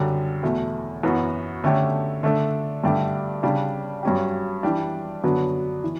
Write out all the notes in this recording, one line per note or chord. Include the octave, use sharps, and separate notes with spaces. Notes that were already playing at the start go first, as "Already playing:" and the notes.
Already playing: F#2 D3 G3
E2 B2 A3
F#2 E3 B3 F#4
D3 A3 C#4 G4
D3 A3 D4 A4
G2 D3 A3 D4 G4
C#3 G3 D4
G2 F#3 C#4 G4
E3 G3 D4
F#2 D3 F#3 B3 D4
E3